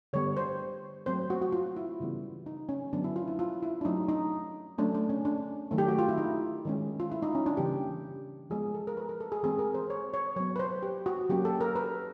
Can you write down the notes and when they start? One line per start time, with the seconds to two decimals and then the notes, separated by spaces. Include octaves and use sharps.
0.13 D3 G3 B3 C#5
0.37 C5
1.06 F#3 A3 C4 C5
1.30 F#4
1.42 F#4
1.52 F4
1.76 E4
2.00 C#3 E3 G3 B3
2.46 D#4
2.69 C#4
2.93 D3 F#3 B3 D4
3.04 E4
3.16 F4
3.28 E4
3.39 F4
3.63 E4
3.81 D4
3.85 F#3 A3 C#4 D#4
4.09 D#4
4.78 F#3 A3 C#4 D4
4.95 D4
5.09 C#4
5.25 D4
5.71 D#3 F#3 A3
5.78 G4
5.88 F#4
5.99 F4
6.09 E4
6.18 D#4
6.65 D#3 G#3 C#4
7.00 F4
7.12 E4
7.22 D#4
7.35 C#4
7.46 D4
7.57 C#3 E3 G3 A#3 G4
8.50 F3 G#3 B3 G#4
8.74 A4
8.87 A#4
8.97 B4
9.09 A#4
9.20 A4
9.32 G#4
9.43 E3 G#3 C4 G#4
9.59 A#4
9.74 C5
9.90 C#5
10.14 C#5
10.36 F#3 C#5
10.40 B3
10.56 B4
10.59 C5
10.83 G4
11.06 F#4
11.29 F#3 A#3 C#4 G4
11.45 A4
11.61 A#4
11.76 B4